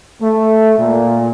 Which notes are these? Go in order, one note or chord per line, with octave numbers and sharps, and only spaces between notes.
A3
A#2